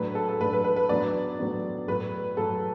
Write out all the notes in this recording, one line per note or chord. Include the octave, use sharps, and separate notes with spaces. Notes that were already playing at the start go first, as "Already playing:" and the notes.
Already playing: A2 F#3 D4 B4
A4
A4
A2 F#3 D4 B4
B4
B4
B4
A2 F#3 B3 D4 D5
A2 F#3 B3 D4
A2 F#3 A3 B4
A2 F#3 A3 A4